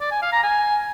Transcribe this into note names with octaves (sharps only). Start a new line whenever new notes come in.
D5
G#5
F5
A#5
G#5